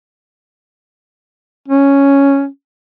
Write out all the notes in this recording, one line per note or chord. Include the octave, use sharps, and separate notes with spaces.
C#4